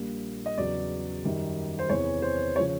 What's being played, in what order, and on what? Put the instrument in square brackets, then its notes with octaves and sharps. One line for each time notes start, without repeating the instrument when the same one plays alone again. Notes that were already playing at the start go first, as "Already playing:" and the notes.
Already playing: [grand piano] A#1 A#2 G3 A#3
D#5
E2 C#3 F#3 D5
F#2 D#3 G3
C5
E2 C3 E3 C#5
C5
C#3 F3 C#5